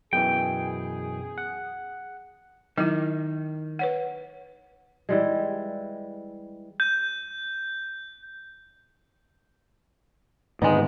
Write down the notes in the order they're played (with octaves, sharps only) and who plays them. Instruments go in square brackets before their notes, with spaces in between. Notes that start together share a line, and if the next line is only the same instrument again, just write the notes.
[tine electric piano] F#2 B2 E3 [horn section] G#4 [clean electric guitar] G5
[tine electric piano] F#5
[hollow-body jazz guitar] D#3 [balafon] F#3 E4
[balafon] B4 C#5 F#5
[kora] E3 G3 G#3
[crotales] G6
[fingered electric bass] G#2 D3 D#3 [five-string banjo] G#3 D#4 [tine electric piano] B3